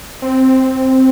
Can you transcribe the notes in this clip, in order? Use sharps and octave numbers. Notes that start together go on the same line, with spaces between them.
C4